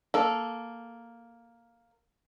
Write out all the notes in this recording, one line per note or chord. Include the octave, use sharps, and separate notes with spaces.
A#3 A4